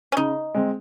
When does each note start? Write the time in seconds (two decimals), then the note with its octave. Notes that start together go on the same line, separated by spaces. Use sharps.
0.12 C#4
0.17 C#3 D#4
0.54 G#3 C4